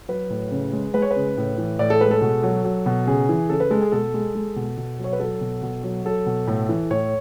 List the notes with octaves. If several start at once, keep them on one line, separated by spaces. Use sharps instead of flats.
F#3 B4
A2
C#3
G#3
G#3 B4
C#5
B4
C#3
A2
E3
A2 D5
A4
G#3 B4
A4
B2
F#3
F#3
B2
C#3 G#4
E3
C#3 A4
B4
G#3 A4
G#4
B2 A4
G#3
G#3
B2
B2
F#3
C#5
B4
F#3 A4
B2
B2
F#3
F#3 A4
B2
A2
E3
A2 C#5